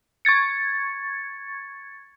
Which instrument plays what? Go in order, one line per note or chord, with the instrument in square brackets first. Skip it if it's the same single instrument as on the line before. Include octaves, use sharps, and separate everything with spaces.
[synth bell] C#6 G#6 A6 C#7